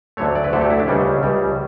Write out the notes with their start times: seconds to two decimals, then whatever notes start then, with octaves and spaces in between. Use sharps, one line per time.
0.17 D2 D3 F#3 A3 C#5
0.35 D5
0.44 B4
0.53 D2 D3 F#3 A3 A4
0.61 G4
0.70 E4
0.80 D4
0.88 C#2 C#3 G3 C#4
1.23 C#2 C#3 G3